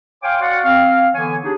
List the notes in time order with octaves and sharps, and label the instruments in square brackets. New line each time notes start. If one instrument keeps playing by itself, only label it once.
[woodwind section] C#5 F5 G5 G#5 C6 D6
F#4 D5 F5 F#5
C4 F5
D3 E3 B3 C#5 G#5
D4 D#4 G4 G#4